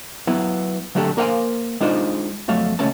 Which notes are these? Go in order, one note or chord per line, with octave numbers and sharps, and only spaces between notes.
F#3 B3 E4
D3 F#3 A3 D4 G4 A4
A#3 A#4 C5 F5 F#5 G#5
G#3 D4 D#4 F4 C5
F2 F#3 A3 F5
C#2 A3 C#4 A5